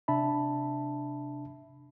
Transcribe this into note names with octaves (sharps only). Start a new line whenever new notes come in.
C3 D4 E5 A5 B5